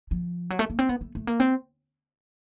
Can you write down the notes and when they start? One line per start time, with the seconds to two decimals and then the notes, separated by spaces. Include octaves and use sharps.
0.11 F3
0.50 F#3
0.59 A3
0.70 A#3
0.79 C4
0.89 B3
1.01 A3
1.15 A3
1.27 A#3
1.40 C4